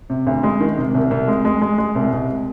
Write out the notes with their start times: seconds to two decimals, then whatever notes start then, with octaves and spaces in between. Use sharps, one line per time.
0.10 C3
0.27 D2
0.43 G#3
0.61 D#3
0.78 C3
0.94 C2
1.11 C2
1.28 G#3
1.45 G#3
1.62 G#3
1.78 G#3
1.95 C2
2.13 C2